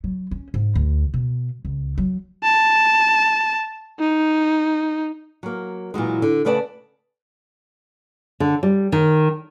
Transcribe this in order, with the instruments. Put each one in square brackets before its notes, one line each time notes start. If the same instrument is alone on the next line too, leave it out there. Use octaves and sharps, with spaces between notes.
[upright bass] F#3
C#4
G#2
D2
B2
C#2
F#3
[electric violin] A5
D#4
[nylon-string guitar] F#3 A#3
A#2 E3 F#3 G#3
D3
C#3 A3 B4 D5 F#5 A5
D3
G3
D#3